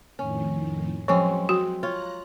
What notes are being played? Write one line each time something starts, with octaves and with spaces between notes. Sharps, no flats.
F2 A2 D#3 C#4
F3 F#3 G#3 C4 C#4
C4 F#4
F4 C#5 A#5 F#6